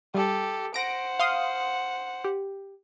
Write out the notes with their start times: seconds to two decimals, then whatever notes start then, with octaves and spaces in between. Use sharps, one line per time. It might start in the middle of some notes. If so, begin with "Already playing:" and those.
0.14 G3 G4 A4
0.74 C5 F#5 A#6 D7
1.19 F5 C6 D#6
2.24 G4